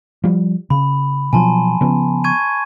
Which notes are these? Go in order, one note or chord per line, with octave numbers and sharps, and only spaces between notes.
F3 G3
C#3 B5
B2 F3 F#3 G#5 A5 C6
C#3 F3 B3
C#6 G#6 D#7